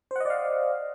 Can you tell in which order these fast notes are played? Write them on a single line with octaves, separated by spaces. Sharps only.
C5 F#5 D#5 D5 F5